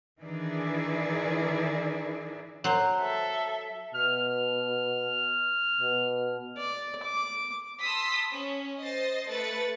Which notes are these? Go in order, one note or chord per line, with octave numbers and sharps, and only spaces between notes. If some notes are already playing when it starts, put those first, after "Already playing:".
D#3 E3 D4 E4 G#4 D5
F#3 C5
A4 E5
B2 F6
B2
D5
D6
A5 B5 C6 D#6 E6 B6
C#4
C5 D#5 A6 C7
A3 B4 A6 C#7